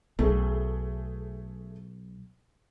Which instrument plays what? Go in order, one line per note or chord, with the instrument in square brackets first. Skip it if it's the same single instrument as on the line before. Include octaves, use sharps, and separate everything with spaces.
[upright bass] B1 [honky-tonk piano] A3 G#4